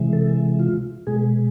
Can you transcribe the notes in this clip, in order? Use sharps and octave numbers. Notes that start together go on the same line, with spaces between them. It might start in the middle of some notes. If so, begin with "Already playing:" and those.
Already playing: C3 E3 G#3
A4
F4
B2 G#3 G#4